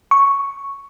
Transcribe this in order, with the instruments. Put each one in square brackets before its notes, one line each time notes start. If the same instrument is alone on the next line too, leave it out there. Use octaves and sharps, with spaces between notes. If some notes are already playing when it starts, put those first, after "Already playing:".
[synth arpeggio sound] C#6